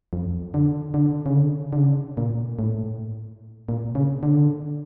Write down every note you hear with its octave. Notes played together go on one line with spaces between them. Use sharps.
F2
D3
D3
C#3
D3
D3
C#3
A#2
A2
A#2
C#3
D3